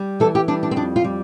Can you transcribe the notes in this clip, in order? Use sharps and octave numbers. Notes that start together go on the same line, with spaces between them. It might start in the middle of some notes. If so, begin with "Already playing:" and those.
Already playing: G3
E3 A4
G4
G3 D4
D4
C4
F2 D4
F4
G3